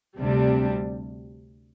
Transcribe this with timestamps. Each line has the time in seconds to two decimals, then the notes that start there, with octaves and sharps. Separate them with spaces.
0.19 D2 C3 G3 D4